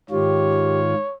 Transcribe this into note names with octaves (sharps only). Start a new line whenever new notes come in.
G#2 D#3 F4 G4 C#5